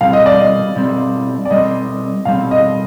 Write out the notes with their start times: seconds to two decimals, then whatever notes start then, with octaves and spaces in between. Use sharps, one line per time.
0.01 B2 G3 C4 F5
0.13 D#5
0.26 D5
0.38 D#5
0.76 B2 G3 C4
1.45 D5
1.50 B2 G3 C4 D#5
2.25 B2 G3 C4 F5
2.51 D#5